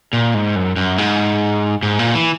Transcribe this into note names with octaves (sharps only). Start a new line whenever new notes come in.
A#2
G#2
F#2
F#2
G#2
G#2
A#2
E3